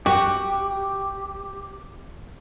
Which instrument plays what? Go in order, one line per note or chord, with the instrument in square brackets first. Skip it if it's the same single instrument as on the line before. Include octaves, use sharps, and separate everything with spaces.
[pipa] F#4 [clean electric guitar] G4 [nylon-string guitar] F#5 G5